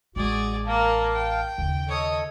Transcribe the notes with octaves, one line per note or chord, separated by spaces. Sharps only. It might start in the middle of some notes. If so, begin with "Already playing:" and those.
A1 G#3 F#4 G#4 D5
A#3 F5 A5
G5
D#2 C#3
A4 C#5 D#5 D#6